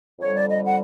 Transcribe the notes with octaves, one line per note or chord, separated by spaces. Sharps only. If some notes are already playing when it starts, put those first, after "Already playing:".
F2 D3 G3 C#5
D5
D#5
F#5